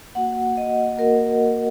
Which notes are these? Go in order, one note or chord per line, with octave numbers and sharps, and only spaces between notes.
A#3 F#4 F#5
D#5
A#3 F#4 A#4